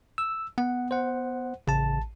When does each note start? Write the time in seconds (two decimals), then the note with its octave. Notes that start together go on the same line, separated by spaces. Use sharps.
0.18 E6
0.58 B3 F#5
0.91 C5 F#5
1.67 A1 C#3 A5